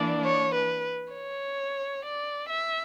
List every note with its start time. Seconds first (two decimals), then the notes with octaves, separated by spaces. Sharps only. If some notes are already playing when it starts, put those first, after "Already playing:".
Already playing: E3 A#3 D4 D5
0.24 C#5
0.54 B4
1.13 C#5
2.04 D5
2.49 E5